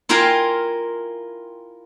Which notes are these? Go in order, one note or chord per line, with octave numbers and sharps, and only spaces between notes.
E4 F4 A#4 F5 G5 G#5